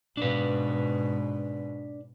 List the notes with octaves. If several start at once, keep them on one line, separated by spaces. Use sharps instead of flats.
G#2 B2 D4 B4